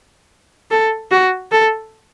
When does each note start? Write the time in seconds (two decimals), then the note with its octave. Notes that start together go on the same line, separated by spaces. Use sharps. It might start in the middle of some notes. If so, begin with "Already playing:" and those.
0.71 A4
1.11 F#4
1.51 A4